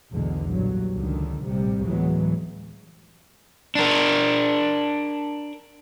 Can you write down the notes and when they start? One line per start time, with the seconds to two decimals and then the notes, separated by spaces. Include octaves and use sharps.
0.12 B1 E2 B2 D3 G#3
0.49 G2 A#2 F#3
0.93 C#2 D3 D#3
1.45 A#1 A2 C3 G3
1.86 D2 A2 E3 F#3 G#3 B3
3.75 D4 A#4